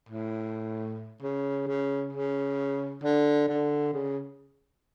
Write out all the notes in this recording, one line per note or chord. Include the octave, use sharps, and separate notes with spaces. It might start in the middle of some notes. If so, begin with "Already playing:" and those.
A2
C#3
C#3
C#3
D3
D3
C#3